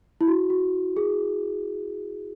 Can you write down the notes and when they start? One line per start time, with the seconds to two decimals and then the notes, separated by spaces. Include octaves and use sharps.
0.21 E4
0.27 F#4
0.50 F#4
0.97 G#4